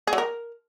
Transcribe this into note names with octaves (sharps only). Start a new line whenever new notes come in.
G#4
F#3
A#4